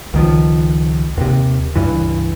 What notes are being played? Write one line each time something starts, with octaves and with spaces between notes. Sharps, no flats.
C#2 D#3 F3
D#2 C3
C#2 G2 E3